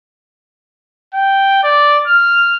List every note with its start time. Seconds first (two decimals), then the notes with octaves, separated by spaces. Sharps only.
1.14 G5
1.63 D5
2.07 F6